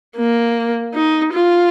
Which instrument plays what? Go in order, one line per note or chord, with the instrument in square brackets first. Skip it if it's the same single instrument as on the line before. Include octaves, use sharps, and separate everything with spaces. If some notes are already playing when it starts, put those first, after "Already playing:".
[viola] A#3
D#4
F4